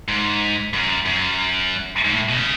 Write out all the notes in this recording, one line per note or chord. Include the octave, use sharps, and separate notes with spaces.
G#2
F#2
F#2
G#2
A2
B2
C#3